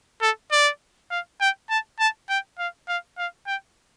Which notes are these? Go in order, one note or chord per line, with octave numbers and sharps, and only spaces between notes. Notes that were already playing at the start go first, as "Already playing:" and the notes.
A4
D5
F5
G5
A5
A5
G5
F5
F5
F5
G5